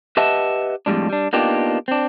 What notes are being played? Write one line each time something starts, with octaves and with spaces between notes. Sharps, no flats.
G4 B4 D#5 E5 F#5 A5
F2 A2 G3 G#3 D4
G3 D4
A#3 B3 D4 D#4 F4 G4
C4 D4